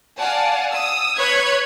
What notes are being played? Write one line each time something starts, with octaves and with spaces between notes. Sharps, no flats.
D5 F5 F#5 G#5 A5
D#6 E6
B4 C#5 C#6 F#6 G#6 B6